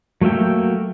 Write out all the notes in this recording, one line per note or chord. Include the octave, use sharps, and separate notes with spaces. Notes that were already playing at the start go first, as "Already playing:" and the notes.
F#3 A3 A#3 E5 G5